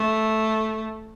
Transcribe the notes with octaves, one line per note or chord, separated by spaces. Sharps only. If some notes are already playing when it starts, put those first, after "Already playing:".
Already playing: A3